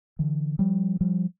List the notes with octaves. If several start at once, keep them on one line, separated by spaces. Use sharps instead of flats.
D3 E3
F3 G3
F3 G3